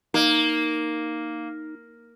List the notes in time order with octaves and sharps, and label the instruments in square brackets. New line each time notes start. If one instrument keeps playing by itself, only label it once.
[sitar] A#3 [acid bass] D#4